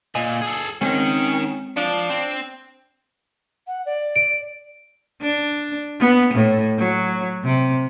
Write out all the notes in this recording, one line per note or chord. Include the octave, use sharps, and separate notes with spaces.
A#2 D#5 G#5
G#4 A4
D#3 G#3 C4 C#4
F3 D4
C4
F#5
D5
D7
D4
B3
A2
F#3
C3